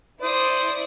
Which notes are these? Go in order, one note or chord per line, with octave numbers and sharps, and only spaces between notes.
E4 C5 D5 D#6